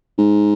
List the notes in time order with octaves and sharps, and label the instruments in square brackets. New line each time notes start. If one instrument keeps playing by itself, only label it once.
[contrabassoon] G#2